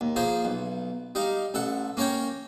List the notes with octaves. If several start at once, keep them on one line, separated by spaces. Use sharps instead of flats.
D#2
F3 A#3 G#4 C5
B1
G3 D#4 F5
A1 A4 F#5
A#3 C#4 A#4 C#5 G5